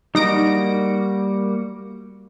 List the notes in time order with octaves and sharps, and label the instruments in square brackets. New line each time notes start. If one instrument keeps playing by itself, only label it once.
[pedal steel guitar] G3 A#3 F#4 [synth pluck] D#4 A#6 D7